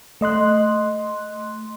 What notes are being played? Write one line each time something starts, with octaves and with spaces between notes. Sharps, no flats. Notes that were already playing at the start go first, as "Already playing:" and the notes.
A3 D#5 C6 F#6